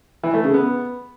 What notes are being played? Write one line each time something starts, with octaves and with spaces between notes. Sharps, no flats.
E3
A3
C#3
B3